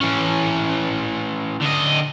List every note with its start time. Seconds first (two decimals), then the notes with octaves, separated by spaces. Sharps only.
0.01 E3 C#4
1.61 D3 D#5